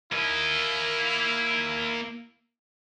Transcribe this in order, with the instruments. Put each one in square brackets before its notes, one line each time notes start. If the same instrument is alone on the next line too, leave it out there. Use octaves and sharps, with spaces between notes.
[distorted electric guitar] A#3 D#5 [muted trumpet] E4